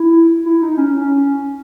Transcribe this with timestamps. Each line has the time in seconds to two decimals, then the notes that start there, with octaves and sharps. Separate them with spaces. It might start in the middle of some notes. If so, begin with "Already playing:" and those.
Already playing: E4
0.46 E4
0.62 D#4
0.77 C#4